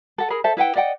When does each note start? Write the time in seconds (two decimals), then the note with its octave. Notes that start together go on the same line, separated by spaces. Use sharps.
0.18 A4 F#5
0.30 G#4 A#4 B5
0.44 A4 C5 E5 A5
0.57 E4 B4 F#5 G5
0.76 D5 D#5 F#5 G5